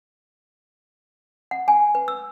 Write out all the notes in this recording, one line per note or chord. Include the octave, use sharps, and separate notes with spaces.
F#5
G#5
B4
E6